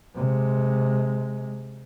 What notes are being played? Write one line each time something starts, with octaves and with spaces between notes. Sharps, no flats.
C3 G#3